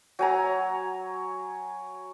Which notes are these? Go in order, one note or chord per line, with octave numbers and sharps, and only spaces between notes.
F#3 G#5 A#5